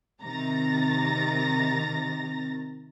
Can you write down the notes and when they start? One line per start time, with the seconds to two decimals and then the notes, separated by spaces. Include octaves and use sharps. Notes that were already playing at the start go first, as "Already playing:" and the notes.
0.22 C3 D#3 A#5 A6 A#6